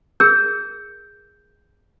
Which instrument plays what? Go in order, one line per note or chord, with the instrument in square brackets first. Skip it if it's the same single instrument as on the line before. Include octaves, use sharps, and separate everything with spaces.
[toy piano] G#4 A#4 [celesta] G6